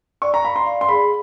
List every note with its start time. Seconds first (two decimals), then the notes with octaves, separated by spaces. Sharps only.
0.22 D5 C#6
0.34 A#5
0.44 F5 B5
0.56 C6
0.66 F5
0.81 C6
0.89 G#4 B5